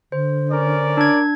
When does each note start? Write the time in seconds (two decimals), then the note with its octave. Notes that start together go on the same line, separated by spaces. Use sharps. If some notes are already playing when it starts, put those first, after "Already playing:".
0.12 D3 C5
0.51 C#4 A#4 D5
0.97 D4 G#6